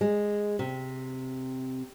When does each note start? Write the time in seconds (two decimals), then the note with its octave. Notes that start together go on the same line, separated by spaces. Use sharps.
0.01 G#3
0.59 C3